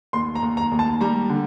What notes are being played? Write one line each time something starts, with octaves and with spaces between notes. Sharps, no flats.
D#2 C6
A#5
D#2
A#5
D#2
A5
G3 A#5
D3